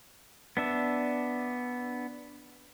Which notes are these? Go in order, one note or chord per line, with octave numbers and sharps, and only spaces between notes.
B3 D4 E5